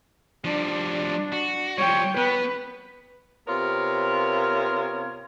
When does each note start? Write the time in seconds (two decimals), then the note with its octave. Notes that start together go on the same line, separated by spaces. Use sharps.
0.45 F3 G3 D4
1.33 F#4
1.78 F3 G3 C#5 G5
2.17 B3 B4
3.48 C3 B3 F4 A#4 C#5